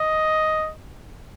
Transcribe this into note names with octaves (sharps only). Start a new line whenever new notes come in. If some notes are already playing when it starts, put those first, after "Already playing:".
Already playing: D#5